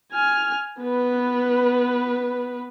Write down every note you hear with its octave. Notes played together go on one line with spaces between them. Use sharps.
G#5 F6
B3 B4